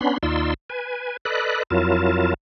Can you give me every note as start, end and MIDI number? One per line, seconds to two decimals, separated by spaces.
0.01 0.18 59
0.01 0.18 61
0.01 0.18 62
0.01 0.18 83
0.01 0.18 84
0.23 0.54 39
0.23 0.54 63
0.23 0.54 65
0.23 0.54 74
0.23 0.54 84
0.23 0.54 88
0.70 1.17 71
0.70 1.17 80
1.25 1.63 69
1.25 1.63 71
1.25 1.63 74
1.25 1.63 75
1.25 1.63 83
1.25 1.63 90
1.71 2.34 41
1.71 2.34 54
1.71 2.34 64
1.71 2.34 65
1.71 2.34 70
1.71 2.34 81